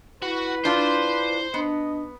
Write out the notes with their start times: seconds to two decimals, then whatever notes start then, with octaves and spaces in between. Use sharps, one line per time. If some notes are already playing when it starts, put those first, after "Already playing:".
0.22 E4 F#4 B4
0.65 D4 F4 C5 C6
1.54 B3 D4 D#5